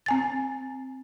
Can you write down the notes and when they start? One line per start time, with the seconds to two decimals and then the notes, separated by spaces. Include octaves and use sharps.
0.06 C4 G#5 A6